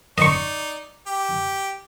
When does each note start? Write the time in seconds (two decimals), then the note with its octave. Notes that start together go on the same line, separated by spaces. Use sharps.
0.18 D#4 D5 D#5 C#6
1.07 G4